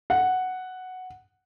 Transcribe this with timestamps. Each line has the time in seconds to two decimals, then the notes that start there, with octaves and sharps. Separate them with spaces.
0.10 F#5